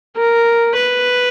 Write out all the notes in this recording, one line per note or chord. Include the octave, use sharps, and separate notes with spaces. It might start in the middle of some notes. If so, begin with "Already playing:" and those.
A#4
B4